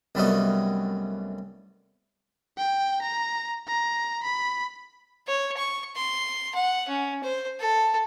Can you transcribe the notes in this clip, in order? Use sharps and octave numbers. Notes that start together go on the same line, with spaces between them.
C2 F#2 G3 A3 B3 D#4
G5
A#5
A#5
B5
C#5
C#6
C6
F#5
C#4
C5
A4